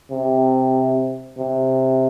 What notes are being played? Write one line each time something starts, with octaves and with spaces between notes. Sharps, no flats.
C3
C3